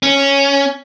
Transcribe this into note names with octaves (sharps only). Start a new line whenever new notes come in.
C#4